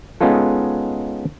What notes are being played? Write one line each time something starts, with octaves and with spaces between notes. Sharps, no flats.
G#3 B3 C#4 D#4 F4 A4